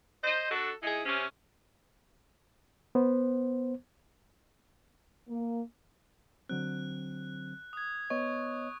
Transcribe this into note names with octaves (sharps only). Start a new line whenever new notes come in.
C5 D#5
D4 F#4 A4
G#3 D#4 E4 G#4
C3 C#4
B3 C5
A#3
D3 F#3 C4 F#6
D#6 G#6
B3 C#5 D#5 C#6